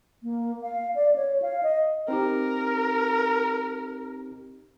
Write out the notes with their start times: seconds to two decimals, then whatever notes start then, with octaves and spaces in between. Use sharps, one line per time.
0.23 A#3
0.63 F5
0.95 D5
1.16 C#5
1.42 F5
1.63 D#5
2.08 C4 D#4 G4 A#4